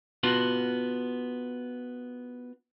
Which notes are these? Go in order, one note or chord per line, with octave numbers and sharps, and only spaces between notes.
B3 D4 F4 F#4